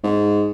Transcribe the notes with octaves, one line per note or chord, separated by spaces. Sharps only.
G#2